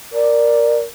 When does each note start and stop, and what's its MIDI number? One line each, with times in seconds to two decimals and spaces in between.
0.14 0.86 70
0.14 0.79 74